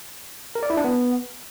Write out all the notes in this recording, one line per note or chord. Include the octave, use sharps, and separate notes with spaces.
A#4
D5
E4
D4
B3